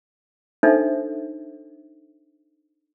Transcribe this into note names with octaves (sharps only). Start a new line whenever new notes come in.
D4 D#4 A4 C5 E5